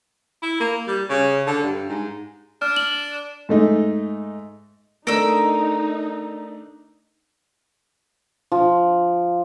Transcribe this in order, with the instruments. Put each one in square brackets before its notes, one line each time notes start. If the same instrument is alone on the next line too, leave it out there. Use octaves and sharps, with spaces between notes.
[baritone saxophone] E4
A#3
G3
C#3
D3
G2
G#2
[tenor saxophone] D4 [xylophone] F6
[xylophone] F#7
[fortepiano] G#2 A3 D#4
[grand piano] A3 D4 [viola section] D#4 [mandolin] A#4 E6
[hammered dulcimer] F3